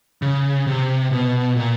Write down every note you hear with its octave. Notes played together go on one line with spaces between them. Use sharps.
C#3
C3
B2
A#2